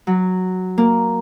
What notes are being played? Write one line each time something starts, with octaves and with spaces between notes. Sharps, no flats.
F#3
A#3